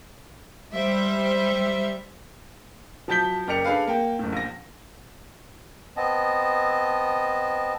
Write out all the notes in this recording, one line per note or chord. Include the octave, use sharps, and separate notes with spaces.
G3 C5 E5
F3 F#3 A5 G6 B6 G7
F#1 A#4 D5 G5 C#7 F7
D4 G#4 A4 B4 F5
A#3 G5
F#1 A2
A#1 A#6
B3 C4 D#5 A5